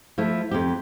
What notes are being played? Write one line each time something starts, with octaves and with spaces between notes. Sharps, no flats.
F3 A3 E4
F2 G4